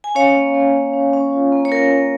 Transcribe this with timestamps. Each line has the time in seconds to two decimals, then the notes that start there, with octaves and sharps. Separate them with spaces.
0.04 G#5
0.15 C#4 C#5 F5
0.35 A#3
0.54 A#3
0.74 C#4
0.94 C#4
1.13 C#4
1.32 F4
1.52 A#3
1.65 C#5
1.71 F4 A#4
1.91 A#3